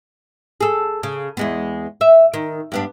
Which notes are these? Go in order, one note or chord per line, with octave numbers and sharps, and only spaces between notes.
G#4 A4
C#3
E2 G#3 B3
E5
D#3
G2 B3 D4